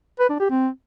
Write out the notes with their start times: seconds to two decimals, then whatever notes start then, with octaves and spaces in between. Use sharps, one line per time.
0.19 B4
0.30 D4
0.40 G4
0.50 C4